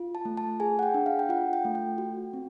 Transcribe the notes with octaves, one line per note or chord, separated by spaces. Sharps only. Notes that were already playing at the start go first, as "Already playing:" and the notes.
Already playing: F4
A5
A3
A5
G#4 G#5
F#5
G5
D4
F5
G5
F4 F#5
G5
A3
G5
F#4
C4